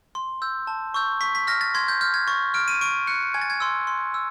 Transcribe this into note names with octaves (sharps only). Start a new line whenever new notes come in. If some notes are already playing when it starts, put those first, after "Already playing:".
C6
E6 G6
A5
C#6 E6 G6
C#6 B6
B6
F6 A#6
A6
C6 G#6
G6
F6 G6
G#6
C#6 A6
F6 D7
D#7
C#6 D7
F#6 C#7
G#5 G#6
A6
G#6
C6 E6
C6
E6